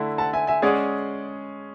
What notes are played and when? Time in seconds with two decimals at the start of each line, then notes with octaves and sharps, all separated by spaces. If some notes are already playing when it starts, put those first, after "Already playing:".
Already playing: D3 A3 E4
0.18 F#5 A5
0.33 E5 G#5
0.47 E5 G#5
0.62 G#3 C#4 G#4 D5 F#5